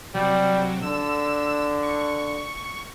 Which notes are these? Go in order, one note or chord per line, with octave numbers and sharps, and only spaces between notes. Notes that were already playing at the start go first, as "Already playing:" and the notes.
C3 F#3 G3
D3 E6
C#6